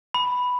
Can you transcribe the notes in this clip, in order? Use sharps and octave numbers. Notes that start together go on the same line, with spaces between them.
B5